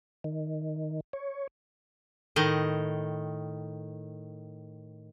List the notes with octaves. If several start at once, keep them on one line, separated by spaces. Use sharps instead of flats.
D#3
C#5
A2 D#3 D#5